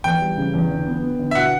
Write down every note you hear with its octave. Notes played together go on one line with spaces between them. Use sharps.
E2 G5
G3
C#3
E2
D3
B3
B3
D3
E5
B2 F#5